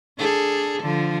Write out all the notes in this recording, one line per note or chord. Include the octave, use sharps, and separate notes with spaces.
D4 G#4 A4
D3 F3